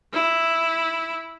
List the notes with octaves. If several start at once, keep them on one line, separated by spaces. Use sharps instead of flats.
E4